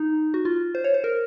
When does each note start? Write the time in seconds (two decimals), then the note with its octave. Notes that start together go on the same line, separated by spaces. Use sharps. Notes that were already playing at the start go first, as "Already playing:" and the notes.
Already playing: D#4
0.34 F#4
0.45 F4
0.75 C5
0.84 C#5
0.94 C5
1.04 A#4